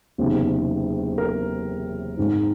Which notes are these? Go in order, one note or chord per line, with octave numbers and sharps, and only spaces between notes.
F#1 E2 C3 D#3
A#4
G#1 G#2 D#3